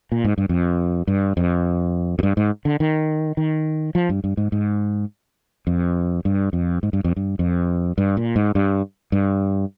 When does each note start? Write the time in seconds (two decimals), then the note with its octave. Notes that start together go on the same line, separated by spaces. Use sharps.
0.12 A#2
0.24 G#2
0.38 G2
0.49 F2
1.07 G2
1.37 F2
2.19 F2
2.23 G2
2.37 G#2
2.65 D3
2.80 D#3
3.37 D#3
3.95 F3
4.09 G2
4.24 G2
4.37 G#2
4.52 G#2
5.67 F2
6.25 G2
6.53 F2
6.83 G#2
6.93 G2
7.04 F2
7.16 G2
7.39 F2
7.98 G2
8.17 A#2
8.36 G#2
8.55 G2
9.12 G2